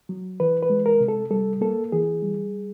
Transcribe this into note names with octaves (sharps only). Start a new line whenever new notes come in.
F#3
E3 B4
B4
G#3
A#4
C3
A4
G3 A4
A#3 A4
E3 G#4
G3